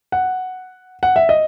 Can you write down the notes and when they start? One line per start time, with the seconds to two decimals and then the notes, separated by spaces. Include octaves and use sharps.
0.12 F#5
1.03 F#5
1.16 E5
1.29 D#5